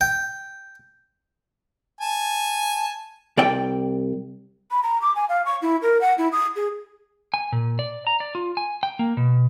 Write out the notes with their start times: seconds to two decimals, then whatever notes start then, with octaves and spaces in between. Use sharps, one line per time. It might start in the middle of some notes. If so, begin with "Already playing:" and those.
0.01 G5
2.01 G#5 A5
3.37 C2 D5 G5
4.71 B5
4.83 A#5
5.02 D6
5.16 G#5
5.29 F5
5.46 C#6
5.62 E4
5.82 A#4
6.01 F#5
6.18 E4
6.32 D#6
6.56 G#4
7.34 G#5
7.52 A#2
7.79 D5
8.07 A#5
8.20 D5
8.35 F4
8.57 G#5
8.83 G5
8.99 A#3
9.17 B2